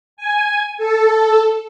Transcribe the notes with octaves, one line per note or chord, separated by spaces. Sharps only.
G#5
A4